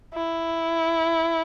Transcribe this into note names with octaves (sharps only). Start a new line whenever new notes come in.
E4